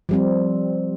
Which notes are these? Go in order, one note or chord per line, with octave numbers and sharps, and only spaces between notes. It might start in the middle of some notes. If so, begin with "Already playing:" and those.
F3 G3 C4